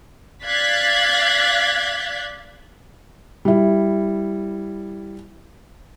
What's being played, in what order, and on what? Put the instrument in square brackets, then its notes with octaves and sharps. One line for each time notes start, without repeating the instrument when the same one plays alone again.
[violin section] D5 F5 F#6 G#6 A6 B6
[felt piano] G3 E4